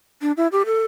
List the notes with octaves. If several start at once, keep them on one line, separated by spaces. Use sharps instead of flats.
D4
E4
G4
A4